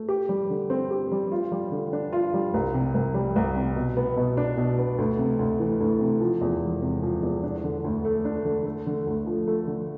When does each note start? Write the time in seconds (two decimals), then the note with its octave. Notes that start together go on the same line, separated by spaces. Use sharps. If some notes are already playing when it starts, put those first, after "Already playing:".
Already playing: A3
0.09 G4
0.29 G3
0.50 D3
0.70 C4
0.91 G4
1.12 G3
1.32 F4
1.52 G3
1.72 D3
1.93 D4
2.13 F4
2.34 G3
2.54 C2
2.74 C3
2.94 C2
3.14 G3
3.36 C2
3.56 C3
3.76 B2
3.97 B3
4.17 B2
4.37 D4
4.57 B2
4.79 B3
4.98 D2
5.19 C3
5.39 D2
5.59 E3
5.80 D2
6.01 C3
6.21 F3
6.41 E2
6.62 E1
6.82 C3
7.03 F3
7.23 E2
7.43 D4
7.64 D3
7.84 D2
8.05 A3
8.25 D4
8.45 D3
8.66 A3
8.86 D3
9.07 D2
9.26 F3
9.47 A3
9.67 D3